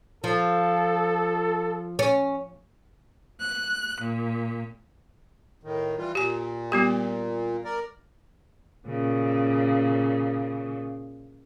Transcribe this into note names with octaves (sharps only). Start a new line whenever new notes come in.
F3 A4
C#4
F#6
A#2
A2 D#3
E3 G3 F4
A#2 G4 G#5
G3 B3 G4
A#4 D5
A#2 C#3